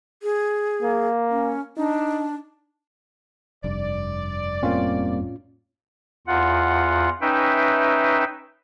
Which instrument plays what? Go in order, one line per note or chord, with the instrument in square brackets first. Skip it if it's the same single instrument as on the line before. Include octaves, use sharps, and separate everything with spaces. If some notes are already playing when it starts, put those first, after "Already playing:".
[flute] G#4
[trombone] A#3
[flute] C#4
[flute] D4 [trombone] D#4
[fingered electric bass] F1 G2 [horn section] D5
[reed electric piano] A2 C#4 F4 [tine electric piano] G3 A#3 C4
[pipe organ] E2 F4 F#5
C#4 D#4 B4 E5 G5